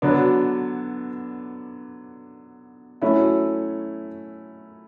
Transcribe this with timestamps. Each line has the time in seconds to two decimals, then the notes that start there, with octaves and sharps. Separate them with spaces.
0.02 D3 F#3 B3 D4
3.02 F#3 A3 C#4 E4